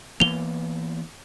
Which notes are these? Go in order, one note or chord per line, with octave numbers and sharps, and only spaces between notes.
E3 A#3 B3 F7 G7